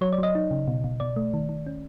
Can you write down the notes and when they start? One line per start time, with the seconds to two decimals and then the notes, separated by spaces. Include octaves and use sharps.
0.01 F#3 C#5
0.13 D5
0.18 F#3 D#5
0.35 D#4
0.51 C#3
0.68 B2
0.84 B2
1.00 B2 D5
1.16 A3
1.34 D#3
1.49 D#3
1.66 C#4